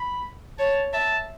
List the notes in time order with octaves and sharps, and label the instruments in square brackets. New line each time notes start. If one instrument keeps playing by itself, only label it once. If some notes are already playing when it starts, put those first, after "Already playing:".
Already playing: [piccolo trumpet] B5
[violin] C#5 [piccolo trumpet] A5
[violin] E5 [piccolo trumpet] A5